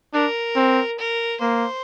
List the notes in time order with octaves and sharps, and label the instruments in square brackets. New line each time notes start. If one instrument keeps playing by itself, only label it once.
[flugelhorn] D4 [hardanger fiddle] A#4
[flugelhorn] C4
[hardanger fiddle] A#4
[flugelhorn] A#3 [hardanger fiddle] C5